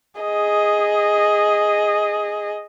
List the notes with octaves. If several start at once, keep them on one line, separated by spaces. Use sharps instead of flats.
G#4 D#5